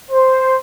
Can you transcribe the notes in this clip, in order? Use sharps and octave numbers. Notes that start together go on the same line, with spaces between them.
C5